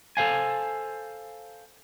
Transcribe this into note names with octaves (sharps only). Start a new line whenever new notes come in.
A4 C5 F5 G#5